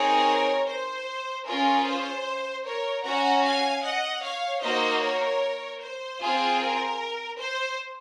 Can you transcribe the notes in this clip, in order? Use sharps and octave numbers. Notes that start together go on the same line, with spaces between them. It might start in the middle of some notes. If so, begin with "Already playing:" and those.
Already playing: C4 D#4 G#4 A#4 C#5
C5
C#4 F4 G#4 A#4
C5
A#4 C#5
C#4 F#4 F#5 A#5
F5 G#5
D#5 F#5
C#5 F5
A#3 D#4 F#4 C5 D#5
A#4 C#5
C5
C4 F4 G#4
A#4
C5